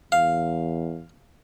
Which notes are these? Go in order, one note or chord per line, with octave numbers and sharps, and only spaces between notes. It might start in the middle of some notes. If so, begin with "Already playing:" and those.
E2 F5